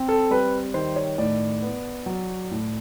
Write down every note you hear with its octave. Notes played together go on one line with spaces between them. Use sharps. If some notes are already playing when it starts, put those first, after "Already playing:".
Already playing: C4
A4
G3 B4
D#3 C5
C#5
A2 D5
B3
F#3
A2